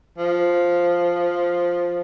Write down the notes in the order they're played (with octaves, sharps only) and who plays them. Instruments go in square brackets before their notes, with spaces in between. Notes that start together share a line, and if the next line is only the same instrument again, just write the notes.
[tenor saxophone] F3